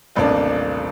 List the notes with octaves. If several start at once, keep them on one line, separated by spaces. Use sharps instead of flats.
D#1 A1 C3 A#3 D4